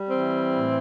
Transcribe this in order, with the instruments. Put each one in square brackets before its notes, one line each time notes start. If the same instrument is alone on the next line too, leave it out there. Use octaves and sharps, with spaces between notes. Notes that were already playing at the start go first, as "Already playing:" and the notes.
Already playing: [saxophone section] G3
E3 C4
A2